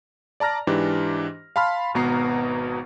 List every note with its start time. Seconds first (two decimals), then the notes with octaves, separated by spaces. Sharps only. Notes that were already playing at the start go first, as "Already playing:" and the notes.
0.40 D5 A5 A#5 F6 A#6
0.67 G#2 E3 D4 G4
1.56 F5 A5 B5 C6 F6
1.94 G#1 B2 B3 A#5 C7